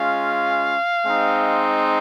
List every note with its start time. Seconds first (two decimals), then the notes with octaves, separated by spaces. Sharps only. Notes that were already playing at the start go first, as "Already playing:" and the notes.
Already playing: G#3 C#4 F4 F5
1.06 G#3 C4 D#4